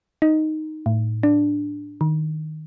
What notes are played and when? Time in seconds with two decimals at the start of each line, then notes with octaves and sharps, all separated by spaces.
0.22 D#4
0.86 A2
1.23 D4
2.01 D#3